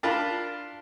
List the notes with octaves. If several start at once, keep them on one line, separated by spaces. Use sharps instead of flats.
D4 F4 A#4 A5 B5